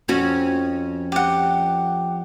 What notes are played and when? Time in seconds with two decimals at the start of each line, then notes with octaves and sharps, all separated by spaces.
0.08 F2 C#4 F#4
1.12 G4 F#5